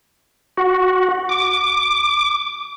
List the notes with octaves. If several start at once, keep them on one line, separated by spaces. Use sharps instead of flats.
F#4
D6